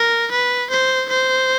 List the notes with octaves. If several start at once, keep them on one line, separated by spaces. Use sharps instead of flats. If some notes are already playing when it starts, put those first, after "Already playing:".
Already playing: A#4
B4
C5
C5